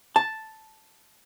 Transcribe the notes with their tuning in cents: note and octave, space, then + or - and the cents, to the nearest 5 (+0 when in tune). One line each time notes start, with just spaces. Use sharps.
A5 +0